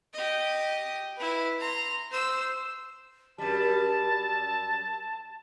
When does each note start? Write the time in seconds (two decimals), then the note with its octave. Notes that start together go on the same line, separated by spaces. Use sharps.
0.13 G4 D#5
1.16 E4 B4
1.60 A#5 C6
2.11 C5 E6
3.38 F#2 G3 A5